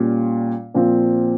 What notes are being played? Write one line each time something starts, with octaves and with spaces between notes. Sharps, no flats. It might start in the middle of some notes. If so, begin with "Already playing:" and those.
Already playing: A#2 G3 C#4 F4
A#2 F3 C4 F4